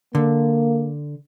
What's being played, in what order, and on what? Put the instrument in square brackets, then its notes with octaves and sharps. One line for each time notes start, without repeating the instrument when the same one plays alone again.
[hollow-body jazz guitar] D3 [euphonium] A#3